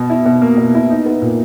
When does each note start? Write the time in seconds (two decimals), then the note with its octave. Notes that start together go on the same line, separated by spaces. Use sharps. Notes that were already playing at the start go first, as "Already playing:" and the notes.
Already playing: B2
0.10 E4
0.26 B2
0.42 A#3
0.57 B2
0.74 E4
0.90 D#4
1.06 B3
1.22 A#2